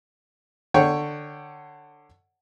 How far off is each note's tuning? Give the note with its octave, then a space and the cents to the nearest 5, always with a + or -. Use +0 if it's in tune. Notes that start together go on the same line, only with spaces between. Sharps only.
D3 +15 C#5 +0 G5 +0